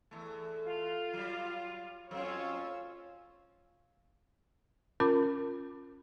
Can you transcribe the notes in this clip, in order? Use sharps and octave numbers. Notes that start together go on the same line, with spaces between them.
E2 A3
F4
F#3 G3
F2 F#3 C#4 F4 C#5 E6
C#4 F4 A#4 B5 D6